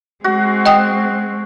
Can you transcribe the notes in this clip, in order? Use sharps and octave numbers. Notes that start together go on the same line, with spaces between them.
G#3 C4 F#4
D#5 G5 D#6